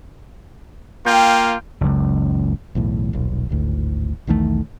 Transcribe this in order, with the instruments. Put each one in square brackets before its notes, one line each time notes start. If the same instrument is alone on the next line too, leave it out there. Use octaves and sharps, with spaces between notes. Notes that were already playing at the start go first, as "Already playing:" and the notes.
[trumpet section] A#3 F4 [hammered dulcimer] G5
[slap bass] F#1 C#2
[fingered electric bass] B1 E2 A2
D#1 B1
D1 G#1 D2 A2
B1 E2 D#3 A3